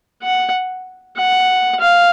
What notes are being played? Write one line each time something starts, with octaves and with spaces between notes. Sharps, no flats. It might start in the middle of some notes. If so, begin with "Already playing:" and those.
F#5
F#5
F5